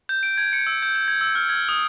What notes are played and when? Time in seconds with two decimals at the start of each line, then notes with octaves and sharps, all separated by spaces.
0.09 G6
0.23 D7
0.38 G#6
0.53 C#7
0.67 E6
0.82 G6
0.95 G6
1.08 G#6
1.21 E6
1.35 F6
1.49 G#6
1.69 D#6